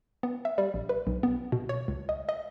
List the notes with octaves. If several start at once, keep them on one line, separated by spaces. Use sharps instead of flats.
B3
E5
G3
A#1
B4
B1
B3
B2
C#5
C#2
D#5
D#5